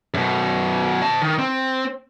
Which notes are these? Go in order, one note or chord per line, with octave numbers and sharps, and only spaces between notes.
F#2 B2
D#5 A5
D#3
C4